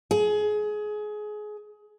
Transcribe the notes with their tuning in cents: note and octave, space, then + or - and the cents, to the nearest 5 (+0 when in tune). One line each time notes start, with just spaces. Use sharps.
G#4 +25